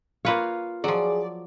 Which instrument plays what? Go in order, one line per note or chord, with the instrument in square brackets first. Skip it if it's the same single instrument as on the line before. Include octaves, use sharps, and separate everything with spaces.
[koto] A#3 B4 C#5 [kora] F4 F5
[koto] F3 F#3 [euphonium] G#4 [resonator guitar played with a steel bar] D5